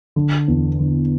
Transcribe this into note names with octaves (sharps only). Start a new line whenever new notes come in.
D3
E2
D3